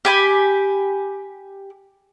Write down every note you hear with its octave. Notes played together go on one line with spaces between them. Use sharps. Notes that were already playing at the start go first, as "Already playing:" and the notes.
G4 G#5 B5